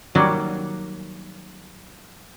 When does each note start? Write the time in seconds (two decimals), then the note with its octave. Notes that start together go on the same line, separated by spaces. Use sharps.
0.15 D#3 F#3 G3 A#3 F#5